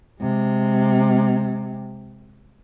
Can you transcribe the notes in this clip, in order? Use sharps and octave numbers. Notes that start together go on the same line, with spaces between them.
C3 G#3